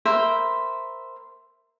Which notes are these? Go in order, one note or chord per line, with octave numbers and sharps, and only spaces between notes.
A#4 C5 E5 B5